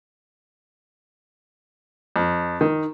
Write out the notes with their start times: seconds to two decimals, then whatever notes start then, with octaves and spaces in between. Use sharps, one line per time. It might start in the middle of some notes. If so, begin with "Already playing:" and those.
2.16 F2
2.61 D#3